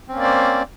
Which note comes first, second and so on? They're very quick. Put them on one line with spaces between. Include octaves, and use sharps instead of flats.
C4 C#4 A#3 D5 C5